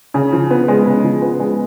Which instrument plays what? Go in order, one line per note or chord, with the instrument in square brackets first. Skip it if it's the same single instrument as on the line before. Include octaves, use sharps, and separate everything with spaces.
[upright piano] C#3
F3
B3
G#3
C#3
F3
B3
G#3